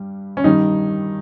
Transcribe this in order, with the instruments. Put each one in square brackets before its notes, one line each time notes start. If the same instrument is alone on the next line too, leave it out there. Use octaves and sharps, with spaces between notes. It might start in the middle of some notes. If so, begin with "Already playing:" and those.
Already playing: [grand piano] G2 G3
C#4
G2 D#3 G3 D#4